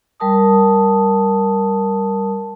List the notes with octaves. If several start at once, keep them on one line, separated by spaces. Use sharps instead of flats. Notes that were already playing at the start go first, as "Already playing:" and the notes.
G3 A#4 A5 D#6